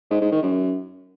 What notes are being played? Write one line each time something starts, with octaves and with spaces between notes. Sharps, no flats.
G#2
G#2
D#3
F#2